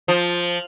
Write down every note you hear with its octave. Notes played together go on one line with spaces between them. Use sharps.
F3